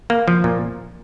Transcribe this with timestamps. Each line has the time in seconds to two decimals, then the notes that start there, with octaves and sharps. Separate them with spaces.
0.10 A#3
0.28 F3
0.44 A#2